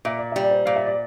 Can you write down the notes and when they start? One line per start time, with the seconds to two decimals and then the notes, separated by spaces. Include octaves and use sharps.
0.05 A#2 E5
0.19 D5
0.32 G3 E5
0.44 D5
0.51 C5
0.66 A#2 F5
0.76 E5
0.86 D5